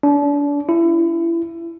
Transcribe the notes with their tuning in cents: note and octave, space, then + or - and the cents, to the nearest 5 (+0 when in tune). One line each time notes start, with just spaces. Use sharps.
D4 -35
E4 +25